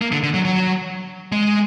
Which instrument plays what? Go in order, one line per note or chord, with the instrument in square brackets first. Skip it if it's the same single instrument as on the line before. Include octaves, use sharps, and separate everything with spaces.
[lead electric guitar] A#3
D3
D3
F#3
F#3
G#3